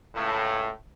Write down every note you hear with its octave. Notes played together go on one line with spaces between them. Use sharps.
C#2 A2